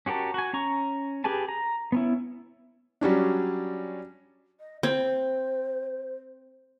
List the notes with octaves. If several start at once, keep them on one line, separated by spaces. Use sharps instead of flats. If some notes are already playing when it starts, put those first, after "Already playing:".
C#4 F#4 G4 A#4 A5
F#4 G#5
C#4 A#5 C#6
G4 G#4 B4 G#5 A5
A#5
B3 C#4 E4
F#3 G3 C#4 D4
D#5
C4 C5